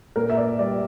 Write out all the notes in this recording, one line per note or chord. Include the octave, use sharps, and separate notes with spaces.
A#2 A#4
E5
D5
G3 D5